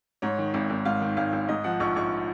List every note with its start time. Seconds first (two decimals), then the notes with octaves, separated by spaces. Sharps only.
0.22 G#2 C#5
0.38 D#3
0.54 G#1
0.70 G#1
0.85 G#2 F5
1.01 D#3
1.17 G#1 F5
1.33 G#1
1.49 G#2 D#5
1.64 F3 F#5
1.80 A#1 C#6
1.96 A#1 C#6